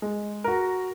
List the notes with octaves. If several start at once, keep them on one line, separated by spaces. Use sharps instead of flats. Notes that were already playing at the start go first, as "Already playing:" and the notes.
G#3
F#4 A#4